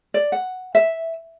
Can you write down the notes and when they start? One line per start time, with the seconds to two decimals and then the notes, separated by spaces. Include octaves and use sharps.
0.14 D5
0.32 F#5
0.75 E5